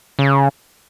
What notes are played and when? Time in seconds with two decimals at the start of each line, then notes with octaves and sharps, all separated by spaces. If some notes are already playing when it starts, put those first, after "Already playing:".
0.19 C#3